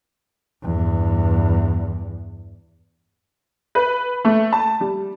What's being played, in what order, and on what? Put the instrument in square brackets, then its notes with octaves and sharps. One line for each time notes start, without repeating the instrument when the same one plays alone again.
[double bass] E2 G2
[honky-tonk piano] B4
A3
A5
G3